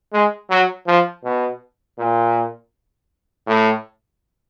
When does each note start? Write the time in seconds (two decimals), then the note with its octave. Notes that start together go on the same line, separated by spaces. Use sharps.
0.13 G#3
0.50 F#3
0.87 F3
1.24 B2
1.98 A#2
3.47 A2